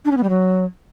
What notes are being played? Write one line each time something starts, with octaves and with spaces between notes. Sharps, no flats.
D4
C#4
B3
G3
F#3